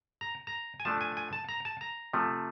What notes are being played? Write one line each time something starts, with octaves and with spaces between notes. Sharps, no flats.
A#5
A#5
G#5
F3 A3 D4 A5
G#5
G#5
A5
A#5
A5
A#5
C3 F3 A3